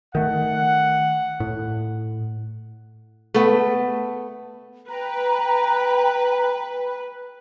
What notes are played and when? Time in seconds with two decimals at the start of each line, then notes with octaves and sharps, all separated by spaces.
0.15 D#3 A3 F#5
1.40 A2
3.34 A3 B3
4.89 B4 G5 A#5